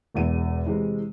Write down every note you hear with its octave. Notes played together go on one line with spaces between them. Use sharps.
E1 E2 E5 D#7
C3 E3 G#3